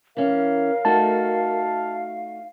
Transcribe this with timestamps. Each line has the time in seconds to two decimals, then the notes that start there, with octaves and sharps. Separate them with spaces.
0.17 E3 C#4 A#4 F5
0.85 A3 D#4 F#4 A5